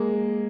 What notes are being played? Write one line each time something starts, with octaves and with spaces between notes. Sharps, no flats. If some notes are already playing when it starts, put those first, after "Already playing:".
Already playing: G#3 A#3